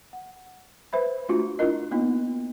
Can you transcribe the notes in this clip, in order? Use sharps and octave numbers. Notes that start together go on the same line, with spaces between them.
F#5
B4 C5 E5 B5
A3 D4 F4 F#4
D4 E4 F4 A#4 D#5
A#3 B3 D#4 F4